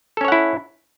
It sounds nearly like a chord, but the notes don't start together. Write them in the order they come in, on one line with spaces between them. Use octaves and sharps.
A4 C#4 C#5 F#5 E4